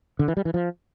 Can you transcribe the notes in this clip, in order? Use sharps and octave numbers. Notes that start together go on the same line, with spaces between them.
D3
E3
G3
E3
F3